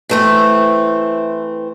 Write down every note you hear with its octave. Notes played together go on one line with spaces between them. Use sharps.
E3 A3 C4